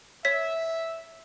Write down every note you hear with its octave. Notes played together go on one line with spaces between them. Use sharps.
C#5 E5 B6